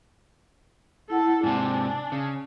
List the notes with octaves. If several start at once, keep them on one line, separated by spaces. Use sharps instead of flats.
E4 A4 F#5 E6
G#2 C3 D4 G#5
C#3